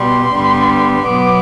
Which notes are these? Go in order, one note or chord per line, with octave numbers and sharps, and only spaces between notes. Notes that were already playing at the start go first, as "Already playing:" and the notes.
Already playing: B2 G3 B3 C6
G2 D3 G3 B3
B2 F#3 B3 D6